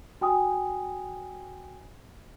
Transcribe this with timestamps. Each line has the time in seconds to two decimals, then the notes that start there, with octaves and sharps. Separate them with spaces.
0.21 F#4 G5 G#5 D#6